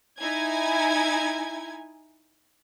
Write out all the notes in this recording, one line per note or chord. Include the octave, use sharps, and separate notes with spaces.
D#4 E4 G#5 G#6